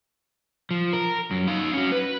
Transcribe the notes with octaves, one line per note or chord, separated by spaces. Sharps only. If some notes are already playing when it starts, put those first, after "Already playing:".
F3
A#4
F#2
D#4 F5
C#4 F#4
B4